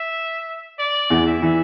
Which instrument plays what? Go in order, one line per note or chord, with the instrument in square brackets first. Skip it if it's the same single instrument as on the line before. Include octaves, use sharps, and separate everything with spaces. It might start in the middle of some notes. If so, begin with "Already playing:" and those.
Already playing: [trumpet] E5
D5
[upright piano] E2 E3
[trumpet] E5
[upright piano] E3